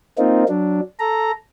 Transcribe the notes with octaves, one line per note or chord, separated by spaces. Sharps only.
A#3 C4 D#4 F4
F#3 D4
A4 A#5